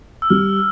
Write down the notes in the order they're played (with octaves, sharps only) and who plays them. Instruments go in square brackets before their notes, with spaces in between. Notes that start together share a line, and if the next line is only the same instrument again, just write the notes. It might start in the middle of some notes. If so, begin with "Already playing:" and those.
[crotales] E6
[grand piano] G3 [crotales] F6